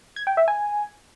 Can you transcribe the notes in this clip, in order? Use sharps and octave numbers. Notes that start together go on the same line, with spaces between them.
G#6
G5
E5
G#5